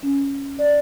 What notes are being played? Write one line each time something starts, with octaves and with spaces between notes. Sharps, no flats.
C#4
D5